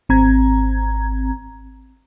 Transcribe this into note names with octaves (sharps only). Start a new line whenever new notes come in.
G#1 C4 A#5 G#6